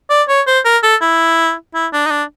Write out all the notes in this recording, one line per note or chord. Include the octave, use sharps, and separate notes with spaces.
D5
C#5
C5
A#4
A4
E4
E4
D4
D#4
D4